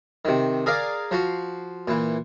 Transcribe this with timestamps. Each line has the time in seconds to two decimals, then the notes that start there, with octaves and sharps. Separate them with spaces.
0.25 C3 D#3
0.66 G#4 A#4 D5 F5
1.11 F3 F#4 C6
1.88 A#2 E3